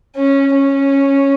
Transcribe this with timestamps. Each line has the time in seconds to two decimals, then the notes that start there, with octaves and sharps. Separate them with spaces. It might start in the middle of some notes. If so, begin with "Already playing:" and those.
0.16 C#4
0.54 C#4